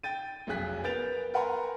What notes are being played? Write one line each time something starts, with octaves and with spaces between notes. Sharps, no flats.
G5 A6 D#7
F1 B1 F#2 G#4 F#6 B6
B3 A#4 G6 A6 D7 F7
A#4 B4 F#5 G#5 A#5 C6